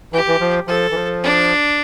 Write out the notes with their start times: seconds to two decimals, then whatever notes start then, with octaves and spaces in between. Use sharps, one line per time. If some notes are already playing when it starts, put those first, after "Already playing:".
0.13 E3 G4
0.28 E3
0.40 F3
0.68 F3 A4
0.91 E3
0.95 F3
1.23 D4